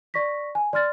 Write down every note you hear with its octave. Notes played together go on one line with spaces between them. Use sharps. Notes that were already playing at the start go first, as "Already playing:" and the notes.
D5 C#6 A#6 B6
G#5
D5 C6 F6 A6